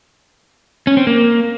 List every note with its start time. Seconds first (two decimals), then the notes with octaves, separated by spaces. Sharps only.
0.87 C#4
0.97 C4
1.07 A#3